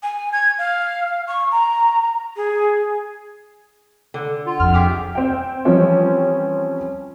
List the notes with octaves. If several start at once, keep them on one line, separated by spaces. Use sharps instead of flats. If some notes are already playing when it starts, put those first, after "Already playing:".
G#5
G#6
F5
C#6
A#5
G#4
D3
F4 F#5
F2 F6
G4 G#4 E5 D6
C4 G5
E3 F3 G3 C4 C#4